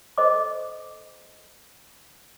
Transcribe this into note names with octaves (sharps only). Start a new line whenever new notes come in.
A4 C5 D#5 D6